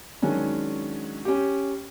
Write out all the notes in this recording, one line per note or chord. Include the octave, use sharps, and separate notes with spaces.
D#3 F#3 G#3 C#4 D4
C#4 G4